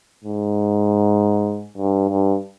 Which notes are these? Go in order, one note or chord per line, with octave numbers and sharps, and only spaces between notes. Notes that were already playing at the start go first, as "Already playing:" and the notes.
G#2
G2
G2